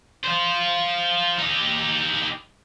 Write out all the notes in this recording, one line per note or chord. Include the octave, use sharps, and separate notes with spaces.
F4 C5
D#4 G4